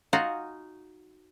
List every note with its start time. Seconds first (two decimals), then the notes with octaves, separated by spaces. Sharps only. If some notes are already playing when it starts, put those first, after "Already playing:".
0.13 D#4 F4 F#4 F#5 G#5